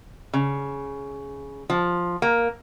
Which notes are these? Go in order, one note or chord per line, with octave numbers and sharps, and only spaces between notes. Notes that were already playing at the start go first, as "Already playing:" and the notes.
C#3
F3
A#3